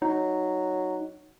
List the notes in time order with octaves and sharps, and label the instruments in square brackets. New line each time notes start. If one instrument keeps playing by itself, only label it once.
[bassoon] F#3 [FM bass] D#4